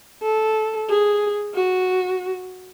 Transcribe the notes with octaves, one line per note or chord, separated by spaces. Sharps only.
A4
G#4
F#4